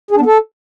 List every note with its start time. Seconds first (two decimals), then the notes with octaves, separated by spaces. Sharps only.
0.11 G#4
0.16 D4
0.21 B3
0.26 A4